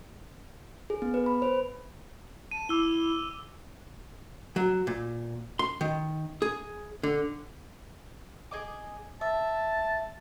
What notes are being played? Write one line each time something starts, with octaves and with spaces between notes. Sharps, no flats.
G#4
B3
B4
B5
C5
A5 D#7
E4 D6 E6 G7
F#3
A#2
C6
D#3
G#4
D3
G#4 D#5 D6
E5 A5